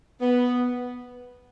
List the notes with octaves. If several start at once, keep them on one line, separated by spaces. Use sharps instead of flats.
B3